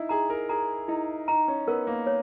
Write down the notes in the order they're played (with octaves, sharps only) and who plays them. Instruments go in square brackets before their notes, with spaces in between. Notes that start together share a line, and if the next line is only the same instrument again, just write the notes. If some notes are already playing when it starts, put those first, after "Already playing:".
Already playing: [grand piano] D#4 E4
[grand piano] G#4 [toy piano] A#5
[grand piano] A#4
[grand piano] G#4 [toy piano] A#5
[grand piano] D#4 [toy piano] E4
[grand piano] D#4 [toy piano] A#5
[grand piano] C#4
[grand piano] B3 [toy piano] A#4
[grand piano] A#3
[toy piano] C#5